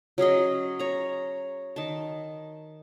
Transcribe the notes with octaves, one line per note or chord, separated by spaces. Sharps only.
F#3 C#4 G#4 D#5
C#5 A#5
D#3 A5